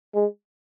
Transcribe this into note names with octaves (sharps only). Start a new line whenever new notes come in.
G#3